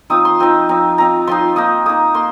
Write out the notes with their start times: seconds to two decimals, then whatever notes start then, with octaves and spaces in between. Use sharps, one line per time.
0.10 F3 C4 D#4 D#6
0.25 C6
0.40 F3 C4 D#4
0.69 F3 C4 D#4
0.98 F3 C4 D#4 A#5
1.27 F3 C4 D#4 C6
1.56 A#3 D#4 D#6
1.86 A#3 D#4 D#6
2.14 A#3 C6